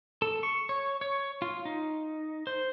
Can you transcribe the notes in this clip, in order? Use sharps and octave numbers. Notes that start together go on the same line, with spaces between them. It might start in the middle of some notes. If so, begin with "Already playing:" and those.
A4
C#6
C#5
C#5
F4
D#4
C5